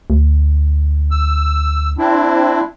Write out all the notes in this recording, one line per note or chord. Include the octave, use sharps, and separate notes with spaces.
D2
E6
C4 D4 E4